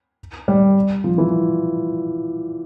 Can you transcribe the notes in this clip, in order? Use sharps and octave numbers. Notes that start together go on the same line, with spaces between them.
G3
F3
E3